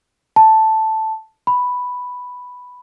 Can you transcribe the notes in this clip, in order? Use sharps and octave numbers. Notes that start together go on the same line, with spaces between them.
A5
B5